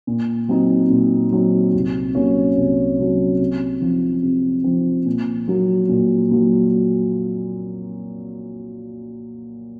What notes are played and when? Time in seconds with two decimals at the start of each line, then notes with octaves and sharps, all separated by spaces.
0.07 A#2
0.48 F#3 C4 D#4
0.90 A#2
1.32 F#3 C4 D#4
1.74 C2
2.15 C3 F#3 A#3 C#4
2.57 C2
2.98 C3 F#3 A#3 C#4
3.39 C3
3.82 F3 C4
4.23 C3
4.64 F3 C4
5.06 A#2
5.48 F#3 A#3
5.89 A#2
6.31 F#3 A#3